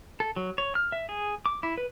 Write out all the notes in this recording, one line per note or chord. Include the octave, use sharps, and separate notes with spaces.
A4
F#3
C#5
F6
E5
G#4
D6
E4
B4